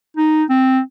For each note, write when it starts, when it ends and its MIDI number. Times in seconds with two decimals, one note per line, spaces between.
0.17 0.43 63
0.50 0.80 60